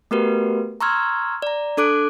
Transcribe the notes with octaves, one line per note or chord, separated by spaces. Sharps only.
A3 B3 F#4 G4 A#4 B4
A#5 C6 C#6 E6 F6 G#6
D5 A#5
D4 A4 D6 F#6 D7